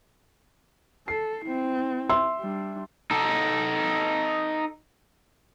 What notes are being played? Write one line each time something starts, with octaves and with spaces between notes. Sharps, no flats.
A4 C7
C4 E4
E5 C6 E6
G3 D4
D#4 A4